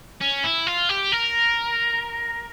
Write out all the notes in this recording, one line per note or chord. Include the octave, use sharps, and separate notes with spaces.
C#4
E4
F4
G4
A#4